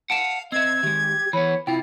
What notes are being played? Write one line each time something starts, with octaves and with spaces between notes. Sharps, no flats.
F5 F#5 A5 D7 E7
C4 D#5 E5 G#6
D#3 G#3 G4
E3 B3 C#5 B5
C3 E4 F4 G5